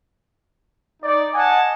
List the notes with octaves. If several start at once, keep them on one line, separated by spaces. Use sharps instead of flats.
D#4 D5
D#5 F#5 G#5 A5